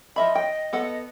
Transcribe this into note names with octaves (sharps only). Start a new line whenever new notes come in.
F3 D#5 E5 B5
G5
B3 A4 F#5